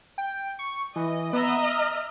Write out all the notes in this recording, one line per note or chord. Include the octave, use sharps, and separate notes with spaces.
G5
C#6
E3 D#5
B3 D#5 E5 A#5
F6